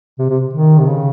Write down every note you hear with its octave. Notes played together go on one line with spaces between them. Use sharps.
C3
C3
D#3
C3
C#3